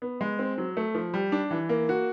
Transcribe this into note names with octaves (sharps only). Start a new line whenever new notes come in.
B3
G#3
C4
F#3
A3
F3
G3
D4
E3
A#3
F#4